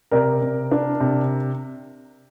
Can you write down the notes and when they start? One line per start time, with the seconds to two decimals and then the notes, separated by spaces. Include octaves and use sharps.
0.11 C3 A#4 D5
0.41 C3
0.71 D4
1.00 C3